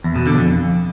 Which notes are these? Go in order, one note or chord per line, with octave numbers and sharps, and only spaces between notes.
E2
B2
D3
F2